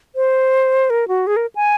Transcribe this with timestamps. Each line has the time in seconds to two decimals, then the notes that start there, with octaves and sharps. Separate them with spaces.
0.16 C5
0.90 A#4
1.08 F#4
1.27 G#4
1.36 A#4
1.55 G#5